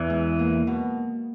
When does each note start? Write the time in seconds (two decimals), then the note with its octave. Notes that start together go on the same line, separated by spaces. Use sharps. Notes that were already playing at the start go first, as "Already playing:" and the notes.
Already playing: E2 E3
0.10 G#3
0.39 A#3
0.67 B2